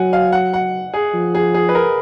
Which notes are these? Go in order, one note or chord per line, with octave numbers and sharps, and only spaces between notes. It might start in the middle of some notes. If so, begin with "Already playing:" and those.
Already playing: F#3 F#5 G#5
F5
F#5
F#5
G#4
F3
G#4
G#4
B4
A#4